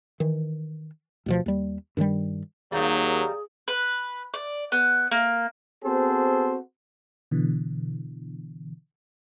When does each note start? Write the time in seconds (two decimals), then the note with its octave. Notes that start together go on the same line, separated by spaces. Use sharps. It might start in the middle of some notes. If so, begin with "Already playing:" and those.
0.20 D#3 E3
1.26 D2 B2 F3
1.46 D#2 G3
1.97 G2 D#3 E3 G3
2.72 D#2 F#3 G3 A#3 D#4 G#4
3.68 B4
4.34 D5
4.72 B3
5.11 A#3
5.83 B3 C4 F#4 G#4 A4 C5
7.31 B2 D3 E3